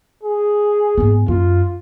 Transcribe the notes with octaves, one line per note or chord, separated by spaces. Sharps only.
G#4
G#2 B3
F#2 F4